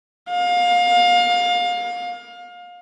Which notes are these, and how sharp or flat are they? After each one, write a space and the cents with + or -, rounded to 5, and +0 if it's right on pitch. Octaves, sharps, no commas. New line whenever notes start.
F5 +25